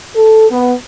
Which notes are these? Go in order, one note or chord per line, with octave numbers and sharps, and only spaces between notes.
A4
B3